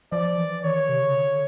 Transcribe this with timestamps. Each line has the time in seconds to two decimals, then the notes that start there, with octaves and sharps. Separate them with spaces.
0.12 F3 D5
0.38 E3
0.63 D#3 C#5
0.89 C3
1.02 C#3
1.15 D3